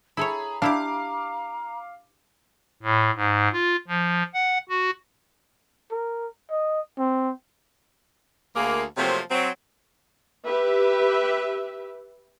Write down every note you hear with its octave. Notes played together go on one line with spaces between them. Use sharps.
E4 G#4 A4 C#5 A#5 B5
D4 E4 G4 F5 D6
A2
G#2
F4
F3
F#5
F#4
A#4
D#5
C4
D2 A#3 G#4
C3 F3 F#3 A3 A#3 C4
F#3 C4
G4 B4 E5